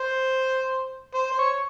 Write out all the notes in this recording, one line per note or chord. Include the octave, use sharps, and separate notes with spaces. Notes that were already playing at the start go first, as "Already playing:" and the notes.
Already playing: C5
C5
C5
C#5